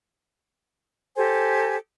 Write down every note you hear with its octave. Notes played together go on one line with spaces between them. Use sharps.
G4 A4 C5 G#5